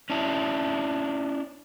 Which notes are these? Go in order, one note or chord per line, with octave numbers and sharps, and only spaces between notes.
C#4 D4 E4